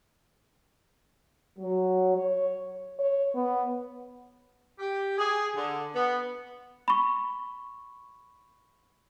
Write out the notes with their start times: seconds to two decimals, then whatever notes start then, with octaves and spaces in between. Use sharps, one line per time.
1.59 F#3
2.16 C#5
2.99 C#5
3.35 B3
4.79 G4
5.18 G#4
5.55 D3
5.95 B3
6.88 B5 C#6